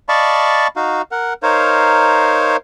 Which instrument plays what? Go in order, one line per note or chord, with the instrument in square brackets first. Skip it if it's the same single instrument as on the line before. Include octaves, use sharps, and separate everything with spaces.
[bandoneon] D5 D#5 F5 A5 B5 C#6
D#4 F#4 F5
A#4 F#5
D#4 A#4 C5 C#5 F5